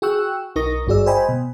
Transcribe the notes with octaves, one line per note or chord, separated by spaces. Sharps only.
F#4 G#4 G5 C#6 E6 F#6
B1 D#4 A#4 C#6 D#6 A#6
G#1 G2 F#4 G#4 D5 E6
C5 D#5 G5 G#5 B5
B2